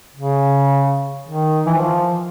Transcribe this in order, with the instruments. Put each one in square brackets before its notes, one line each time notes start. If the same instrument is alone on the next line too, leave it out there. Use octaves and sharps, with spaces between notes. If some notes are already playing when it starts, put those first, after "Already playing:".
[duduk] C#3
D#3
E3
F3